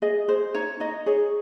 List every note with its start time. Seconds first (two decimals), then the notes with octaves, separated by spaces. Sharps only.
0.02 G#4 D#5
0.28 G#4 C5
0.55 D#4 C#5
0.80 D#4 D#5
1.06 G#4 C#5